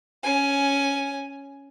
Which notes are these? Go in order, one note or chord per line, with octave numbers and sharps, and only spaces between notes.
C#4 G#5